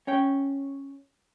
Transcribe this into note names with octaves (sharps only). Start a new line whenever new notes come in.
C#4 C#5 G5